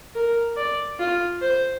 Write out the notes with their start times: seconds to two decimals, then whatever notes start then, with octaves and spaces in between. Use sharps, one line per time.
0.15 A#4
0.57 D5
0.99 F4
1.41 C5